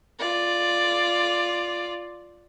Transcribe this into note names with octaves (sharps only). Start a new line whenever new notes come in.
F4 D5